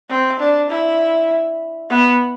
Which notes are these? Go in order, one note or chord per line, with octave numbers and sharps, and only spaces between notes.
C4
D4
E4
B3